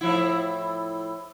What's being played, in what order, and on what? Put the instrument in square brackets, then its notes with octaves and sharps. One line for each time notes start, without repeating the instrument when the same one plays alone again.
[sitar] A2 F3 E4